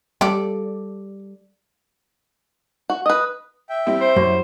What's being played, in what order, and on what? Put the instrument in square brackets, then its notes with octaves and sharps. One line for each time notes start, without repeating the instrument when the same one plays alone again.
[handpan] G3 [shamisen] G4 F5 [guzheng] A4 D5
[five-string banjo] F#4
[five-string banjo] B4 D#5 [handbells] D#6
[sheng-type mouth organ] E5 G5
[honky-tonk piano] G3 C4 E4
[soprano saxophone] C5
[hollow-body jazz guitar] F#2